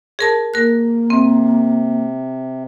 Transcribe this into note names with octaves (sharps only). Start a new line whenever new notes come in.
G#4 A#4 A5
A#3 A#4 F#6
C3 C4